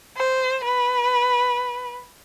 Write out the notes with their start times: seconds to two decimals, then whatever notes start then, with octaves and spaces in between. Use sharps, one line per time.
0.17 C5
0.64 B4